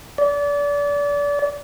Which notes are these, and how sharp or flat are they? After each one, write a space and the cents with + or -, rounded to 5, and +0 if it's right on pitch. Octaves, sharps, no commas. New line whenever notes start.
D5 -30